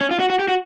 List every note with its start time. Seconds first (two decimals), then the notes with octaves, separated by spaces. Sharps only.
0.01 C#4
0.11 F4
0.20 F#4
0.30 F#4
0.39 G4
0.48 F#4